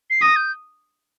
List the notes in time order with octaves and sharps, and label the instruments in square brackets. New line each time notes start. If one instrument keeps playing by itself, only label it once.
[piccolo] C7
[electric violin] D#6 [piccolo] A#6
[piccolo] G6